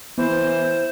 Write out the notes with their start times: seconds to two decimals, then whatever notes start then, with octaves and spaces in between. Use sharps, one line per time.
0.18 E3 B3 C5